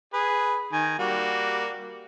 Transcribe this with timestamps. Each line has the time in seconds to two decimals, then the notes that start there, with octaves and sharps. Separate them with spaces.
0.14 G#4 B4
0.73 D#3 G#5
0.99 G3 A#3 F#4